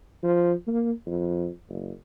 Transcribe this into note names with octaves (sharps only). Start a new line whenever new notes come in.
F3
A#3
F2
F#1